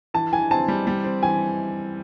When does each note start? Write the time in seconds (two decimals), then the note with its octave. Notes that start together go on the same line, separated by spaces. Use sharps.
0.14 E3 A5
0.32 E3 G#5
0.51 C4 A5
0.68 G3
0.87 G3
1.05 C4
1.23 E3 G#5